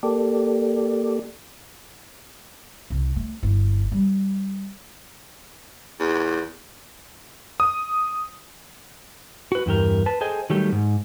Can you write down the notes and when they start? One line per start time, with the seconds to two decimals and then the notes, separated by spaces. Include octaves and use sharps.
0.03 A#3 G4 A4 D5
2.90 C2
3.16 A3
3.43 G1 E4
3.92 G3
6.00 E2
7.60 D#6
9.52 F#4 B4
9.66 E2 G2 G4 A#4
10.06 B4 A5
10.21 G#4 A4 C5 D#5 G5 G#5
10.50 D#3 F#3 G3 A3 G4
10.72 G#2